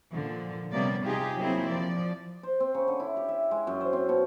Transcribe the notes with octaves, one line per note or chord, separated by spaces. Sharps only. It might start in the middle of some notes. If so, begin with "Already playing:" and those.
A#2 D3 F3
C3 G3 A#3 B3 C#4 D5
C3 D#4 F4 G4 G#4
F#3 A#3 C4 E4 G#4
F3 D5
C5
C4
C#3
D3
E4
G4
E5
G#3
F#2
C5
C4
B2